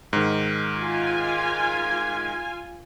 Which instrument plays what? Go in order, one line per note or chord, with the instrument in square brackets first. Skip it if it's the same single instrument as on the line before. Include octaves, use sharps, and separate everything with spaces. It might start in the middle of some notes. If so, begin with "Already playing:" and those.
[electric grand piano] G#2 D#3
[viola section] F4 G#5